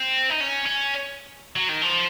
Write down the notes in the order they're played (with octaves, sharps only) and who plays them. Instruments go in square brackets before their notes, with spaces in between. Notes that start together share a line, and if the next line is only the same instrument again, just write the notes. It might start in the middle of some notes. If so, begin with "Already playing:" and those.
Already playing: [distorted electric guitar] C4
D#4
C#4
C#4
F#3
D#3
F3